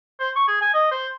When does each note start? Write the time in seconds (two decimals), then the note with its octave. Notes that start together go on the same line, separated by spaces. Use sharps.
0.20 C5
0.36 C#6
0.48 G#4
0.61 G#5
0.74 D#5
0.91 C5